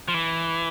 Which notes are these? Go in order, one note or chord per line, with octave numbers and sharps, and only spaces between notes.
F3
E3